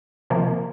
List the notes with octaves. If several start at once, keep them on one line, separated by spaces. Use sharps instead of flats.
C3 F3 A#3